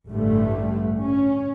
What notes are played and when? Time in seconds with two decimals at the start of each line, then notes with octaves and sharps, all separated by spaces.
0.11 A1 G2 D3 G3 A3
1.03 C#4